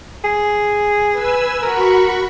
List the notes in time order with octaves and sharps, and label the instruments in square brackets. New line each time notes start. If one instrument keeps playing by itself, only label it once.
[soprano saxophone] G#4
[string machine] B4 G#5 E6
[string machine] F#4 B5 C#6 [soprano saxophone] A#4